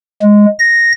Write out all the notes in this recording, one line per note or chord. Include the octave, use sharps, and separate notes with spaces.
G#3
A#6